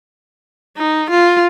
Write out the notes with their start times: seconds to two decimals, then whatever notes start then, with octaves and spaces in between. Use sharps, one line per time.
0.77 D#4
1.10 F4